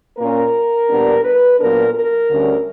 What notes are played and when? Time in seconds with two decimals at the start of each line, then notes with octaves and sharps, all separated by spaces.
0.18 A#2 A#3 C#4 A#4
0.89 A#2 G3 B3 D4
1.24 B4
1.60 A#2 F#3 B3 D4 A#4
1.94 A#4
2.30 D2 D3 G3 C#4